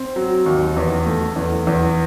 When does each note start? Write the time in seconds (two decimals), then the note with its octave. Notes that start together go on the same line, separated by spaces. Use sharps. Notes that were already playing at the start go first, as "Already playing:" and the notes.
Already playing: C4
0.16 F#3
0.46 D#2
0.76 E2
1.07 A3
1.36 E2
1.67 E2